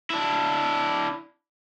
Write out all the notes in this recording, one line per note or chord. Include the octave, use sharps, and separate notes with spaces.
D4 E4